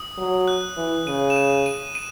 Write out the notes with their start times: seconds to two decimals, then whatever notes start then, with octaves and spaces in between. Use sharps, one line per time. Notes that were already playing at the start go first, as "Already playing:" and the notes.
Already playing: D#6
0.18 F#3
0.48 F#6
0.77 E3
1.07 C#3 D#7
1.30 E7
1.36 D#7
1.66 D#7
1.95 D#7